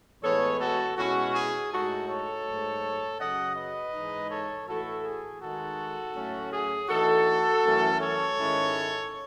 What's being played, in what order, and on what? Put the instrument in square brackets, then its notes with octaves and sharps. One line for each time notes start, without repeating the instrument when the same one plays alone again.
[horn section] A2 E3 G#3 B3 A4 C#5
F#4 A4
B2 G#3 C#4 E4 F#4
G#4
A2 G#3 D#4 F#4 A4
A4 C#5
G#2 F#3 A3
F#2 C#3 F#3 D#5 F#5
B4 D#5
G#2 E3 G#3 D#4
A4 C#5
A2 E3 A3 E4 F#4 A4
G#4
D#3 G#3 D#4 F#4 A4
A2 F#3 A3 C#4
G#4
E3 A3 D#4 F#4 A4
F#2 E3 A3 C#4
A4 C#5
G#2 D#3 G#3 C#4 E4